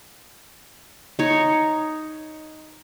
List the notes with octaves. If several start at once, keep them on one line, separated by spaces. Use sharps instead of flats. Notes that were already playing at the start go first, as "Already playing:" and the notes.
D#4 C#5